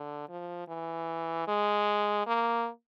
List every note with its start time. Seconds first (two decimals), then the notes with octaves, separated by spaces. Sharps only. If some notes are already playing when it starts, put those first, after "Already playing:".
Already playing: D3
0.29 F3
0.68 E3
1.48 G#3
2.27 A#3